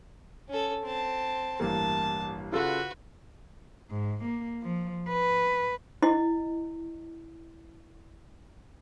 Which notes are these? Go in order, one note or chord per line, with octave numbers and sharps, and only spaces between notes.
C#4 A4
C4 A5
A1 G2 A#3 A5
C#3 F4 F#4 A4 B4
G#2
A#3
F3
B4
E4 D#5